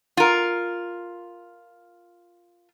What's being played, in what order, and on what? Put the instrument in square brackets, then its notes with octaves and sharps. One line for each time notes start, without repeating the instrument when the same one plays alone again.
[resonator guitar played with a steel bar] F4 A#4